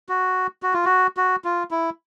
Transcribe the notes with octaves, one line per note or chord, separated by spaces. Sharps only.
F#4
F#4
F4
F#4
F#4
F4
E4